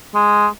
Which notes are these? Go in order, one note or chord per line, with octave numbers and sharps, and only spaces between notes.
G#3